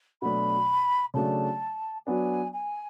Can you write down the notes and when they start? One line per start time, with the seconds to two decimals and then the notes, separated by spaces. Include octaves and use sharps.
0.22 B2 F#3 A3 D4 B5
1.14 C#3 F#3 A3 D4 A5
2.06 F#3 B3 D4 G#5
2.53 G#5